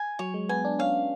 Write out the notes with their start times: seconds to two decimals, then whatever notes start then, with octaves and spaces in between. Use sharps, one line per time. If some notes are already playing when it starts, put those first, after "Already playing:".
Already playing: G#5
0.19 F#3 C#5
0.34 G#3
0.49 B3 G#5
0.65 D4
0.79 C#4 F5